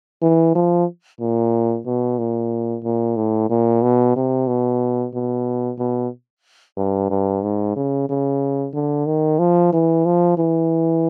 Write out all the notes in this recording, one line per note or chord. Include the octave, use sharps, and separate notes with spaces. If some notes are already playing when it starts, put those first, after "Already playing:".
E3
F3
A#2
B2
A#2
A#2
A2
A#2
B2
C3
B2
B2
B2
G2
G2
G#2
C#3
C#3
D3
D#3
F3
E3
F3
E3